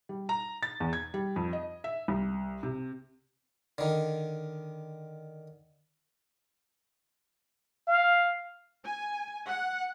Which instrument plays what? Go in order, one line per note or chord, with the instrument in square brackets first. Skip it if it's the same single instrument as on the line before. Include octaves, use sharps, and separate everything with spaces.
[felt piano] G3
A#5
A6
E2
G#6
G3
F2
D#5
E5
C2
C3
[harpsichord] D3 D#3
[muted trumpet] F5
[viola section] G#5
F#5